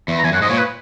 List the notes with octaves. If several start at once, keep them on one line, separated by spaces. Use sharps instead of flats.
E2
A#5
E2 G#5
F#2 F#5
G#2 D#5
A#2 C#5
B4